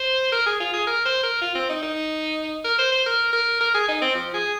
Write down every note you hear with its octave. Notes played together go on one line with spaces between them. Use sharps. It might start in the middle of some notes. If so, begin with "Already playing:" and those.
Already playing: C5
A#4
G#4
F4
G#4
A#4
C5
A#4
F4
C4
D#4
D#4
A#4
C5
C5
A#4
A#4
A#4
G#4
D#4
C4
F3
G#4